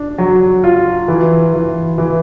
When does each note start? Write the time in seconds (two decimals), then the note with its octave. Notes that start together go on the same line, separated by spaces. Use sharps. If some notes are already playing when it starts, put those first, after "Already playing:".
Already playing: D4
0.18 F#3
0.64 F4
1.08 E3
1.54 E3
1.98 E3